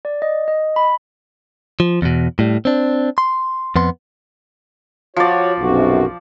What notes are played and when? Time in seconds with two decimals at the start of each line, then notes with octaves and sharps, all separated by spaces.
0.05 D5
0.22 D#5
0.48 D#5
0.76 B5
1.80 F3
2.02 E2 B2
2.39 A2 G3
2.65 C4 D4
3.18 C6
3.76 F2 B3 C6
5.16 F3 F#4 C#5 D5
5.60 B1 F#2 C3 F#4